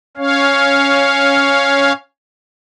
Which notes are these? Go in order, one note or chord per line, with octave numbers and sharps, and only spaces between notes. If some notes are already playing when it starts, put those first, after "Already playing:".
C#4 C#5 F5